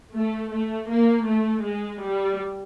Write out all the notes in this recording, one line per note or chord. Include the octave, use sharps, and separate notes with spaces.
A3
A3
A#3
A3
G#3
G3